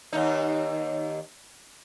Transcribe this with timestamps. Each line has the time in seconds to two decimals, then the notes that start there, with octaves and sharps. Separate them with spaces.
0.13 D#2 D#4